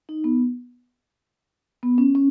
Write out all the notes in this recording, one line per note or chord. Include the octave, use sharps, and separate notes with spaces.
D#4
B3
B3
C#4
C#4